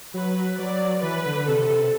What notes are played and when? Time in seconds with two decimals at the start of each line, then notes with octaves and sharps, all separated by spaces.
0.14 F#3 B4
0.59 F#3 D5
1.02 E3 B4
1.26 D3
1.48 C3 A4
1.69 C3